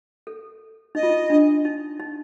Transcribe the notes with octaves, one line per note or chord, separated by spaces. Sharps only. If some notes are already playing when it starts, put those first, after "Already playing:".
A4
D#4 D#5
F4
D#4
D4
D#4
D#4